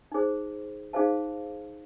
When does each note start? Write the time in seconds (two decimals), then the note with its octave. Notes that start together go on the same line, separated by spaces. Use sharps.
0.12 D#4 G#4 C5
0.93 D#4 G#4 C5 F5 A5